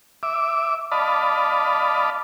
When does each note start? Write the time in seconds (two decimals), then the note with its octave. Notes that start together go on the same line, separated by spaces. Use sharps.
0.23 E5 D6
0.92 D5 D#5 F5 A5 B5